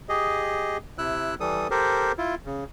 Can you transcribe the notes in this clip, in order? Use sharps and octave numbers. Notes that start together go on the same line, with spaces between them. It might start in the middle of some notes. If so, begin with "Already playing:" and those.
G4 G#4 D#5
C3 E4 E6 F#6
E3 G3 A4 D#6
G4 A4 A#4 C5
E4 F4
C#3